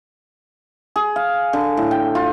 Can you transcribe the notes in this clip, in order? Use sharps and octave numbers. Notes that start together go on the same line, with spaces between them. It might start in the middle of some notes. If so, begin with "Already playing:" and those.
G#4
F5
D3
A2
G5
F4